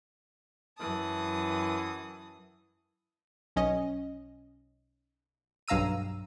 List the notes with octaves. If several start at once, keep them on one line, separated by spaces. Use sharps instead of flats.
F#2 E3 A5 D#6
B1 C#4 D#5
B1 G2 F5 A#5 E6 D#7